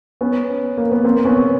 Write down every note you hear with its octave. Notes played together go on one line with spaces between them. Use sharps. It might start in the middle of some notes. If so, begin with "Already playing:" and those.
B3 C#4
A#3
B3
A#3 C4
B3 C#4